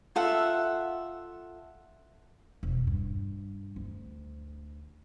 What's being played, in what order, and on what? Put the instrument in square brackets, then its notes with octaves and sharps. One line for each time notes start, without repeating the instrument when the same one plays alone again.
[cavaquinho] F4 A4 E5 F#5
[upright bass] E1
G2
D2